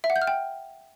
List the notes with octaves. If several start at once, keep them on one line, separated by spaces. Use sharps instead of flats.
E5
F#5
G6
F6
G5